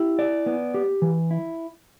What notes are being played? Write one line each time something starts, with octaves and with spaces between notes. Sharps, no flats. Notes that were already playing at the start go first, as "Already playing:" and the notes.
Already playing: E4 G4
D5
B3
G4
E3
E4